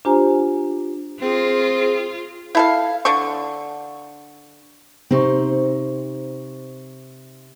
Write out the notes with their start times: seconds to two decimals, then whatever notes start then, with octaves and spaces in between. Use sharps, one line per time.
0.05 D4 F4 G4 C5 G#5 A#5
1.22 C4 F4 G#4
2.55 E4 A4 F5
3.05 D3 D4 A4 C#6
5.11 C3 C4 D#4 C5 C#6